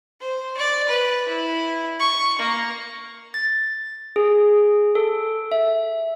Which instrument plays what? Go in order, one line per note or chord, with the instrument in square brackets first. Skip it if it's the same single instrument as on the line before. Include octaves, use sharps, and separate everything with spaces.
[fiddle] C5
D5
B4
E4
C#6
A#3
[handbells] A6
G#4
A4
E5